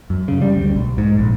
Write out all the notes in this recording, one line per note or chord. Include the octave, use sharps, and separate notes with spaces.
F#2
C#3
G3
D2
B1
G#2
A#1